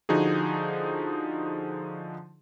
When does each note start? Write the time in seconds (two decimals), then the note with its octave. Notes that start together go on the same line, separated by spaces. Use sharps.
0.09 D3 F3 D#4 F#4 G#4